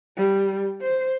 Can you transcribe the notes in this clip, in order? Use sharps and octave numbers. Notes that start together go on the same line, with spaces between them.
G3
C5